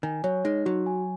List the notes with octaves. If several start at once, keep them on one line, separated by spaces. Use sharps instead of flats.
D#3 G#5
F#3 C#5
G#3 D#4
F#3 F#4
G#5